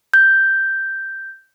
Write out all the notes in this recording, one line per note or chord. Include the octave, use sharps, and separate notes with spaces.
G6